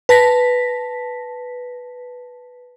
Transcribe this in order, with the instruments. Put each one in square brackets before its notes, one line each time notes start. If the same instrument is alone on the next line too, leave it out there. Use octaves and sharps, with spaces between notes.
[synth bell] B4 A5 A#6 B6